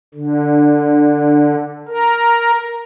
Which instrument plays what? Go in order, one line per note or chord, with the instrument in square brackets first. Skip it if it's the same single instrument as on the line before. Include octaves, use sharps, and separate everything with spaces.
[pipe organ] D3
A#4